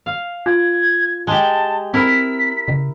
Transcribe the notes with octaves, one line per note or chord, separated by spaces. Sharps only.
F5
F4 G#6
G#3 G4 A5
C4 E4 A#4 B6
C#3